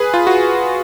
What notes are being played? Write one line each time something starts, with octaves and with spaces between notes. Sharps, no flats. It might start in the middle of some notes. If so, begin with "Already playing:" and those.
Already playing: G#4 B4
F4
F#4